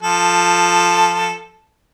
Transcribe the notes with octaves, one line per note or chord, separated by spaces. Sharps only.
F3 A4